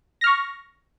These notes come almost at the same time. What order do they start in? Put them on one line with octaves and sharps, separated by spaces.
A#6 F6 C#6